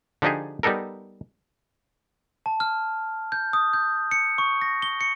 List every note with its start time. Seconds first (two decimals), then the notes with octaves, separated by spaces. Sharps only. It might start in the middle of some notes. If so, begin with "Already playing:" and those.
0.22 D3 F3 D4 D#4 G4 G#4
0.63 G3 B3 D#4 A4 A#4
2.46 A5
2.60 F6
3.32 G6
3.53 D#6
3.73 G6
4.11 C#7
4.38 C#6
4.62 A#6
4.82 G7
5.01 C#7